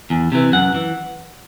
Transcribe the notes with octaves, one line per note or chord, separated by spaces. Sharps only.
E2
C3 E3
F#2 F#5
E3